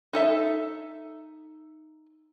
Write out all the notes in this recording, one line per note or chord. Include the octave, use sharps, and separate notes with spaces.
D#4 A4 E5